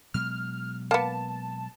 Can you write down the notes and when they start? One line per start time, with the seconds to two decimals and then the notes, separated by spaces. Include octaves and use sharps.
0.14 B2 F#3 G#3 F6
0.91 A#3 B3 A5